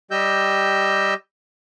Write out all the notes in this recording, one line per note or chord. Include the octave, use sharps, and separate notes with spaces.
G3 G4 D#5 E6 G6